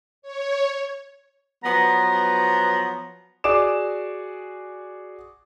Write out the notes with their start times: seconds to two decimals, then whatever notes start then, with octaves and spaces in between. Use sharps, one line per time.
0.22 C#5
1.64 F3 F#3 B3 A#5
3.44 F#4 G#4 D5 D6 E7